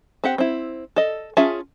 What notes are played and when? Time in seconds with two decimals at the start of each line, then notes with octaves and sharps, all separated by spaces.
0.24 C4 G4 F#5
0.38 C4 E4
0.96 A4 D#5
1.37 C#4 F4 G#4 E5 A5